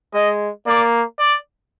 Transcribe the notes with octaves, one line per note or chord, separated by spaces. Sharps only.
G#3 D#5
A#3 D5
D5